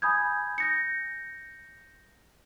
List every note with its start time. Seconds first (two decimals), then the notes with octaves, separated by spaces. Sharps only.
0.02 G#5 B5 D#6 G6 G#6
0.58 G6 A#6 C#7